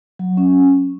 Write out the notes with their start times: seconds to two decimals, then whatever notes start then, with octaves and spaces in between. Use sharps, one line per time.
0.19 F#3
0.37 C#4